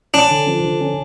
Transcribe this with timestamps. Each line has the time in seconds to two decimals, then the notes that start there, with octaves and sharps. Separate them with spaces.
0.14 C#4 D4
0.31 D3
0.48 F3
0.65 D3
0.81 C#4